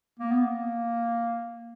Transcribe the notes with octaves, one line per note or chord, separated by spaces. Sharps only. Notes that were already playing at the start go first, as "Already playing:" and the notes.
A#3
B3
A#3